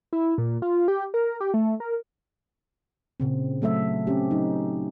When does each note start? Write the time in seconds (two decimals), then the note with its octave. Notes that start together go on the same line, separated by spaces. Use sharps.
0.13 E4
0.38 A#2
0.62 F4
0.88 G4
1.14 A#4
1.40 G4
1.54 A3
1.80 A#4
3.20 A#2 C#3 C4
3.62 F#3 A3 A4 E5
4.07 C4 C#4 G4
4.31 F#3 D#4